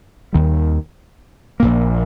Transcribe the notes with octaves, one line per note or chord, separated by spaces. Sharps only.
D#2 D#3 G3
A#1 A#2 A#3